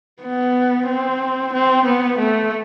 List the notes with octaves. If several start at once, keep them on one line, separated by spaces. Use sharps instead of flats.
B3
C4
C4
B3
A3